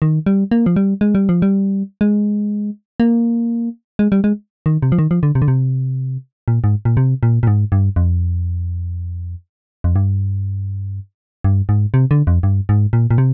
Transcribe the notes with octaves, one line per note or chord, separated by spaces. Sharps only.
D#3
G3
A#3
F3
G3
G#3
G3
F3
G3
G#3
A#3
G#3
G3
G#3
D#3
C3
F3
D#3
F3
D3
C3
D3
C3
A#2
G#2
A#2
C3
A#2
A#2
G#2
G2
F2
F2
G2
G2
G#2
C3
D3
F2
G2
G#2
A#2
A#2
C3